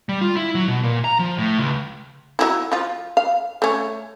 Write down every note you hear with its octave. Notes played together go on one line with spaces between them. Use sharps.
G3
F4
E4
F#3
B2
A#2
A#5
F3
A2
C#2
F#3 D#4 E4
F3 F4
F5
A3 C#4